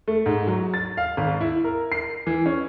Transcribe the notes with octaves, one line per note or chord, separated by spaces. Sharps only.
A3
G#2
F#3
A6
F5
G#1
E4
A#4
C7
E3
C#4